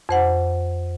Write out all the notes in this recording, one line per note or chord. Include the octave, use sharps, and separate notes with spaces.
F2 C5 F#5